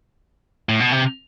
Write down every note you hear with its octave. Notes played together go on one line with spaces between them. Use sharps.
A2
B2
C3